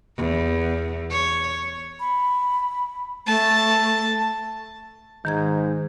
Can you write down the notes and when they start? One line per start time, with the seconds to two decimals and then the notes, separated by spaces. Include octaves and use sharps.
0.18 E2
1.10 C#5
2.00 B5
3.27 A3 A5
5.25 G#2 D#3 A#5 G#6